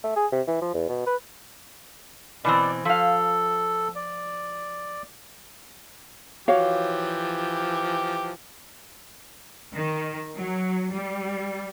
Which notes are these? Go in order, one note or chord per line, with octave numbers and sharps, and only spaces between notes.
A3
G#4
C3
E3
F3
E2
B2
B4
B2 E3 C4 D5
F3 A4 F5
D5
E3 F3 F#4 G4 C#5 F5
D#3
F#3
G3